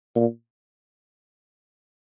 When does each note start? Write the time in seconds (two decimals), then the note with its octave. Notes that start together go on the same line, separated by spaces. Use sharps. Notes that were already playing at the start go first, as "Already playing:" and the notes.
0.16 A#2